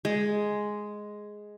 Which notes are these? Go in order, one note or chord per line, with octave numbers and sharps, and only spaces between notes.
G#3